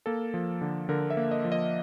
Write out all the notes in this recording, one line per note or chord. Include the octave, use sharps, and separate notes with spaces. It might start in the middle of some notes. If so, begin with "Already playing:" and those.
A#3 A4
F3
D3
D3 A#4
E5
A#3
D#5
F3
D#5